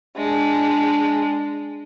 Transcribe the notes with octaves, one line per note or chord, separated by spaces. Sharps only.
G#3 D4